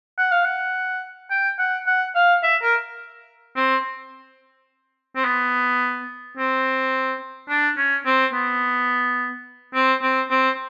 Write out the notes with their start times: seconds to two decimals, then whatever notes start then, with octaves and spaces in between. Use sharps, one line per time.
0.18 F#5
0.31 F5
0.45 F#5
1.30 G5
1.59 F#5
1.87 F#5
2.15 F5
2.43 E5
2.62 A#4
3.56 C4
5.16 C4
5.25 B3
6.37 C4
7.49 D4
7.77 C#4
8.06 C4
8.33 B3
9.74 C4
10.02 C4
10.30 C4